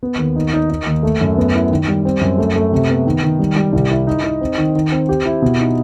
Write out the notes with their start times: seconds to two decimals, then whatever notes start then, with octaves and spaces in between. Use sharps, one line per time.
0.03 B3
0.18 D#2
0.36 D#4
0.53 D#4
0.70 D#4
0.87 D#2
1.03 A3
1.21 F#2
1.38 B3
1.55 E4
1.71 D#3
1.88 G3
2.05 C4
2.21 F#2
2.38 A3
2.56 A3
2.72 C3
2.90 B3
3.07 D#3
3.23 D#3
3.39 G3
3.56 G3
3.73 C2
3.91 E4
4.07 D#4
4.24 D#4
4.41 C4
4.58 D#3
4.75 D#3
4.92 C4
5.09 G4
5.25 E4
5.42 B2
5.60 D#4